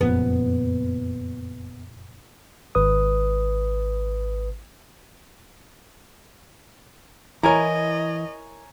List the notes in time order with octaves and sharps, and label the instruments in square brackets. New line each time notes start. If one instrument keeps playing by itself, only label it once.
[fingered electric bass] F#1 F2 A#2 [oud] B3
[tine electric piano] G#1 B4 D#6
[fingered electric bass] E3 [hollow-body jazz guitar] E4 A#4 [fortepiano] C#5 G#5 A#5 [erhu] D#5